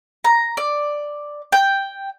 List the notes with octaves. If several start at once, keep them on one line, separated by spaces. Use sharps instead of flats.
A#5
D5
G5